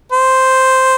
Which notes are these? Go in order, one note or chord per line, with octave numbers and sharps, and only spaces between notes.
C5